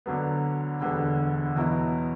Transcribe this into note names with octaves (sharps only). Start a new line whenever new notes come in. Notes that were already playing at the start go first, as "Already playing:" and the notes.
D2 D3 F#3 B3
E1 D2 D3 G3 B3
E2 B2 F#3 B3 E4